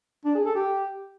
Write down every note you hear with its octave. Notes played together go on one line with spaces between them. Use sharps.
D4
G#4
A4
G4